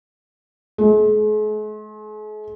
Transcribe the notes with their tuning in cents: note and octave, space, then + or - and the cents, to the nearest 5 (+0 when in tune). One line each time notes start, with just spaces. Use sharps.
G#3 +45